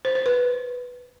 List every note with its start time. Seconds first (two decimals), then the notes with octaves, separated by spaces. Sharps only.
0.05 C5
0.15 C5
0.26 B4